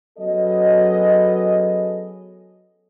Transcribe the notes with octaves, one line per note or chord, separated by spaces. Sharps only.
F#3 B3 C#4 G#4 A4 D#5